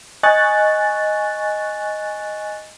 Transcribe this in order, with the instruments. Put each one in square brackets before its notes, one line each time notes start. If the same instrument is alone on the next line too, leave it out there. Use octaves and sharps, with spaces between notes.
[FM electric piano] D#5 G#5 C#6 F#6 A6